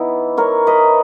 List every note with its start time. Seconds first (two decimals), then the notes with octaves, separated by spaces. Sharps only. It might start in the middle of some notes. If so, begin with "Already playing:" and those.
Already playing: E3 B3 D#4 E4
0.37 A#4 C#5
0.67 B4 D#5